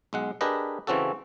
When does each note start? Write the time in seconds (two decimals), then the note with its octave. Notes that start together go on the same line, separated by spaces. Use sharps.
0.13 B1 G#3 F#5
0.41 D4 G4 G#4 A#4 B4 D#5
0.87 C#3 E3 C4 C#4 F#4 A4